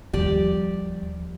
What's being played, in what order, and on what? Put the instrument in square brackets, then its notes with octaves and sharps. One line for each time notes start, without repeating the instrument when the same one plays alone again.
[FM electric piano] D#2 G3 [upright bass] F3 [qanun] G4 D5